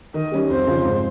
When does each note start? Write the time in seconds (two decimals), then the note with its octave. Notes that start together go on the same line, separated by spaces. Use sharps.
0.14 D#3 D#5
0.32 G3 C#4 G4
0.49 F2 C5
0.67 C#3 F3
0.84 G#2